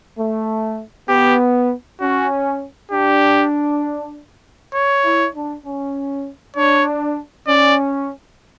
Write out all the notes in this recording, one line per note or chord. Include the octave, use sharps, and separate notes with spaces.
A3
B3 G4
C#4 F#4
D4 G4
C#5
E4
D4
C#4
D4 C#5
C#4 D5